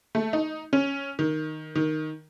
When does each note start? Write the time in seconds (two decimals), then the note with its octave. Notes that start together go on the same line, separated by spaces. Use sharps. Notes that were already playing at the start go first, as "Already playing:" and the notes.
0.15 A3
0.33 D#4
0.73 C#4
1.19 D#3
1.75 D#3